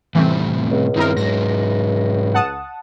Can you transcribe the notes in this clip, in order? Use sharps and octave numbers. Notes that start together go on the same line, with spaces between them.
A2 C3 E3 G3 A3 C4
C#2
G2 D#3 C4 D#4 E4 A#4
G#2 F#3 A#6
F#5 A5 D#6